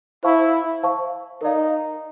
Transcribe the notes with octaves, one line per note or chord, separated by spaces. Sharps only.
E4 C5 F5 A5 C#6
C5 F5 A5 C#6
D#4 A#4 D5 F5